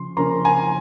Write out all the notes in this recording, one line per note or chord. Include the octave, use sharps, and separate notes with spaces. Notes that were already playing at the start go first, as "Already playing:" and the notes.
Already playing: C#3 F3 C6
C#3 F3 A#3 C#4 A#5 C6
G#5 A#5